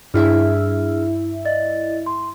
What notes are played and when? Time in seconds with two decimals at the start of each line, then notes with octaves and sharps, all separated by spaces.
0.14 G2 D4 E4 G#4 E5 F6
1.45 D5 D#5 A6
2.06 C6